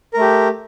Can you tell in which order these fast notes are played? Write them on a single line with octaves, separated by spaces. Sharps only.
A#4 A3 G4